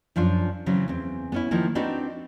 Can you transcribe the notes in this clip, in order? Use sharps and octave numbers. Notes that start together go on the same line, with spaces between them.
F#2 F3 D4 F4
C#3 E3 F#3 C4
E2 C4
B3 C#4 E4
D#3 F3 A#3 E4
C4 D4 D#4 F#4 A4 B4